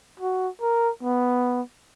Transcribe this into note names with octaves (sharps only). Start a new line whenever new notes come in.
F#4
A#4
B3